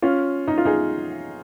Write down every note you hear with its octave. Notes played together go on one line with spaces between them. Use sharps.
C#4 F4
D#4
F4
D#4 G#4